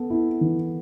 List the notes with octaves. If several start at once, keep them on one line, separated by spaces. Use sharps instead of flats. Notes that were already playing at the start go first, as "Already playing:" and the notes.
Already playing: B3 A4
E4
E3